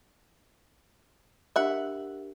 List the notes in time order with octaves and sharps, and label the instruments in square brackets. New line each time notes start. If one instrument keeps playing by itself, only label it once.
[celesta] D4 G4 A#4 [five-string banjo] E5 F#5